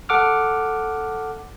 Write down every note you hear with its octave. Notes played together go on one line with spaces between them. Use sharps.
A4 F#5 D6 F6